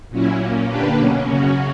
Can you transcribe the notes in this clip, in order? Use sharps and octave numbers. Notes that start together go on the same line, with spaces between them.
A#2 F#3 C#4 E4
A#2 A#3 C#4
D3 A#3 D4 G4 B4
B2 F#3 A#3 C#4
F#2 C#3 F#3 C#4 F#4